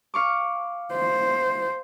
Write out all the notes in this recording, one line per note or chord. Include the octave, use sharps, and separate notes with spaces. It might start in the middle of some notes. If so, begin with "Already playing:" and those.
F5 C#6 D6
C5